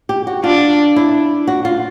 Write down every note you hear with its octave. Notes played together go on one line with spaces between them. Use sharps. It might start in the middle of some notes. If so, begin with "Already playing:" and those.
G4
F#4
D4 F4
E4
F#4
F4